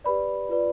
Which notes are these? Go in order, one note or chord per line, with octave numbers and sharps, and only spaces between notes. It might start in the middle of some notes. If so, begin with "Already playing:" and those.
G4 B4 D5 B5
F4 B4 D5